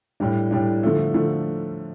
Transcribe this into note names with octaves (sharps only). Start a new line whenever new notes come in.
A2 G3 D4
A2 G3 D4
D3 F3 A3
D3 F3 A3